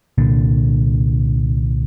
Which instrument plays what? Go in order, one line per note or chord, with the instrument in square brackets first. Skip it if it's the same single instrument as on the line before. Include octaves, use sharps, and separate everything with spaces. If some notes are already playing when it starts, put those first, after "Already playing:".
[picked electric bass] C2 A#2 D3